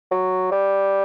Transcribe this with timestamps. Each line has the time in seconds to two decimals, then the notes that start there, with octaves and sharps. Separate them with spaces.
0.11 F#3
0.51 G3